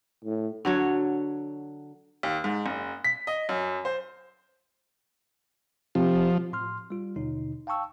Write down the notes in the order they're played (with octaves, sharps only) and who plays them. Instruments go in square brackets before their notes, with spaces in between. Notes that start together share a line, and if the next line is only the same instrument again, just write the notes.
[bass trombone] A2
[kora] D3 F#3 C#5
[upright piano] D#2
G#2
F#1
B6
D#5
F#2
C5
[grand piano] C3 [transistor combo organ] F3
[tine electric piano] A2 C6 F6
G3 F4
D#2 B2 D3 D#4
F5 G5 A5 C#6 E6